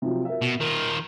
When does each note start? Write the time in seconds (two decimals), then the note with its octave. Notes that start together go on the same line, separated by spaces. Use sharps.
0.02 C3 F3 F#3
0.25 A#4 E5
0.42 B2
0.60 D#3 F4 A#4